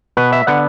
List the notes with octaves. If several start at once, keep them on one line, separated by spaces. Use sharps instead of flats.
B2 B3 B4
E5
D3 B3 F#5